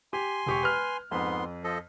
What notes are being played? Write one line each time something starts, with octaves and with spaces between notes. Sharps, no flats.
G4 G#5 C6
E1 G4 C#6
B4 F6
F2 G#2 B3 C6
F3 A4 D#5